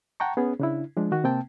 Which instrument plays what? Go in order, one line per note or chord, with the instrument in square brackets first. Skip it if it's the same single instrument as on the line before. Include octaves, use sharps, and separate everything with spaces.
[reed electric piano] F#5 G5 A5 A#5 C#6
B3 C#4 G#4
C#3 D4 E4
F3 G#3 D4
D#3 F#4
C3 A#3 C4 G5 A5